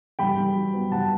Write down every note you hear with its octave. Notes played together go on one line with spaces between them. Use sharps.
G2 G5 B5
G2
F#3
B3
G2 F#5 A5